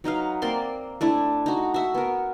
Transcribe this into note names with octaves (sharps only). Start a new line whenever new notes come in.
F#3 D#4 B4 F5
A#3 C4 D5 C6
A3 D4 E4
D#4 F#4
F#4 E5
B3 A#4